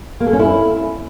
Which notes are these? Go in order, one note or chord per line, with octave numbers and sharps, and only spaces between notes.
A#3
A4
C#4
E4